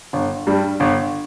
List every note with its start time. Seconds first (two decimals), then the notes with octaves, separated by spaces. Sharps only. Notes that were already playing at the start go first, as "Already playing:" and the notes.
0.13 G1
0.47 G2 G3
0.80 G1